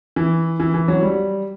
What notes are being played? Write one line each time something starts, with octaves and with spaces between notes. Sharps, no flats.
E3
E3
E3
F#3
G3